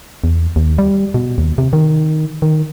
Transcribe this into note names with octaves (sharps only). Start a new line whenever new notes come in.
E2
D#2
G3
B2
D#2
C3
D#3
D#3